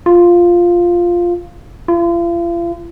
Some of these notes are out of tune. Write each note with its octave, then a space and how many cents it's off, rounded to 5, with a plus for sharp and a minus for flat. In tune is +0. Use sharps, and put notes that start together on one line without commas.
F4 +0
F4 -40